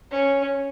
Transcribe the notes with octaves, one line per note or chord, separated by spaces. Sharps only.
C#4